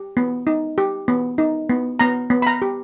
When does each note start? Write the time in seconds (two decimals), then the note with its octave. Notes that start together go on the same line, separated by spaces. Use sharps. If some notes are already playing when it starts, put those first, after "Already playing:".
Already playing: G4
0.17 B3
0.47 D#4
0.78 G4
1.08 B3
1.38 D#4
1.69 B3
1.99 B3 A#5
2.30 B3
2.42 B5
2.47 A#5
2.62 G4